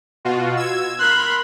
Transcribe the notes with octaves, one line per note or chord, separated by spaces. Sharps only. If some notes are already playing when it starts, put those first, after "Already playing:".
B2 F4 F#4
E6 G#6
A#4 B5 C6 F#6